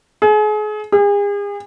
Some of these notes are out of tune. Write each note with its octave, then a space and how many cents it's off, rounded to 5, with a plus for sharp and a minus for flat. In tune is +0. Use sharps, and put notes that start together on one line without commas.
G#4 +35
G#4 -40